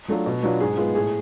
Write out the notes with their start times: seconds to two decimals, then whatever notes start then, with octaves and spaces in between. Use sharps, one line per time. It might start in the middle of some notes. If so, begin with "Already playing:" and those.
0.08 F#3 A3 D4 F4
0.26 B2
0.43 F#3 B3 D4 F4
0.60 G#2 G#4
0.77 G#3 B3 F4
0.95 A2 G#4